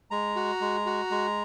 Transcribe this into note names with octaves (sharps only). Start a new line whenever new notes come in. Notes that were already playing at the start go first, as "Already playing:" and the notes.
G#3 A#5
F#4
G#3
F#4
G#3